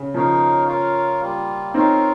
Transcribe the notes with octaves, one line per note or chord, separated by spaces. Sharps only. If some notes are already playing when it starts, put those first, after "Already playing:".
Already playing: C#3
C#3 F3 D#4 A#4 C#5 F5
F4 A#4 C#5 F5
G3 A#3 F4
C4 D#4 F4 A#4 C#5 F5